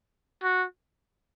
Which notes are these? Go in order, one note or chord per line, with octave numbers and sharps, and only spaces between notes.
F#4